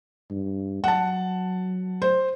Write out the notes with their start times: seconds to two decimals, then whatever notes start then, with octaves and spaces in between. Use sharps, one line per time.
0.30 G2
0.84 F#3 F#5 A5
2.02 C5